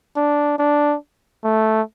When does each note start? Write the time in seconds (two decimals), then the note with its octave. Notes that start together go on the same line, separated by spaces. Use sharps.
0.17 D4
0.59 D4
1.44 A3